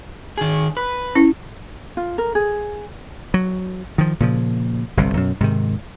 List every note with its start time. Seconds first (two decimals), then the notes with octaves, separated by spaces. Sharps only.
0.38 D#3 G#4
0.77 B4
1.15 C#4 E4
1.97 F4
2.18 A#4
2.35 G#4
3.34 F#3
3.98 D#3 F3
4.20 A#2 C#3 F3
4.97 G1 C2 C3
5.15 F#2 B2 F#3
5.40 G#2 C3 D#3